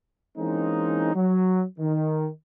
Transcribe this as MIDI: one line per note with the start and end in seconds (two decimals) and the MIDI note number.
0.38 1.12 52
0.38 1.12 56
0.38 1.12 58
0.38 1.12 60
0.38 1.12 61
0.38 1.12 63
1.15 1.63 54
1.79 2.29 51